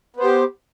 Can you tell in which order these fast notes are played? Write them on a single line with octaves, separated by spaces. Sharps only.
B3 C5 G4